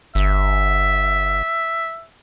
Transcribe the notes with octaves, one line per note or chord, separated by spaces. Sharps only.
G1 E5